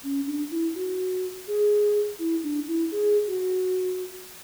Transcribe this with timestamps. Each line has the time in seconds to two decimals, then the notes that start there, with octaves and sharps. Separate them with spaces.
0.04 C#4
0.27 D4
0.51 E4
0.75 F#4
1.48 G#4
2.19 E4
2.43 D4
2.68 E4
2.91 G#4
3.27 F#4